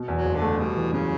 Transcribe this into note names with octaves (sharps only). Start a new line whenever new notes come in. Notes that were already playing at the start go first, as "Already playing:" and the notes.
Already playing: B2
E2
F#3
F#1
D3
A3
B2 G3
E3
F#2 C#3